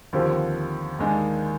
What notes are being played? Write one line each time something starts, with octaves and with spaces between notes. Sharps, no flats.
D#2 D3 F3 C4 G4
D#2 D#3 G#3 D4